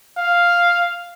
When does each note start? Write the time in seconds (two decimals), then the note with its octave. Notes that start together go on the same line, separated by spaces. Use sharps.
0.17 F5